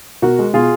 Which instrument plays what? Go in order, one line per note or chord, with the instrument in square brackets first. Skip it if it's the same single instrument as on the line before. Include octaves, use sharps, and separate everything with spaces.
[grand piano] B2 F#4 A#4
G#3
B2 F4 G#4